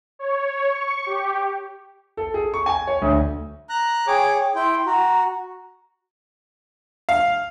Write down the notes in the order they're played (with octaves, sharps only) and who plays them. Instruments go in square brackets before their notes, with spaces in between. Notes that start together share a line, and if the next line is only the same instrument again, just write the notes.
[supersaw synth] C#5
C#6
G4
[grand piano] A4
G#4
C#6
G#5
C#5
D2
[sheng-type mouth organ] A#5 F#6
[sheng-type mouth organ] G#4 C#5 D6 [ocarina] G5
[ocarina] G5
[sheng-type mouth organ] E4 G5 [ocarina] C6
[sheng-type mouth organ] F#4 [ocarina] A#5
[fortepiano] F5